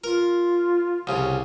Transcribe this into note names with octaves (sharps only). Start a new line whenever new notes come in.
F4 A#4
C2 C#3